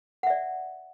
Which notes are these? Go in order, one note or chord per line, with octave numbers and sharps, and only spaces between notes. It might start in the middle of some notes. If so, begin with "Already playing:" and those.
D5 E5 F#5